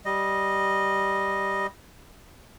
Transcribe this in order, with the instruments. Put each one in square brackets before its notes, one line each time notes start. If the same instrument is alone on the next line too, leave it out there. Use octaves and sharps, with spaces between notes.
[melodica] G3 D#5